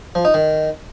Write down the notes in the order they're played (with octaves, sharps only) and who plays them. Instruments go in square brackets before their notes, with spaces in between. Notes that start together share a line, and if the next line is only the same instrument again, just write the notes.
[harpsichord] F3
D#4
D#3